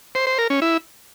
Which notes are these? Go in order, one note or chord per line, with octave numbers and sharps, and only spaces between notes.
C5
C5
A#4
C#4
E4